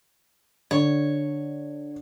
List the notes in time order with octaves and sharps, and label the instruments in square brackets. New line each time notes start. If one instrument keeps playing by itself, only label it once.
[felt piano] D3 [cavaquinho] C#5